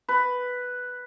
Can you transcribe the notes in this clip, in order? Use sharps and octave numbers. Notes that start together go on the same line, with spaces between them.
B4